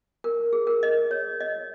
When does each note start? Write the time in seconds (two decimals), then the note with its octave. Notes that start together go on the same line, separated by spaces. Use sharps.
0.24 A#4
0.53 G#4
0.67 A#4
0.83 D#5
1.11 C#5
1.41 D#5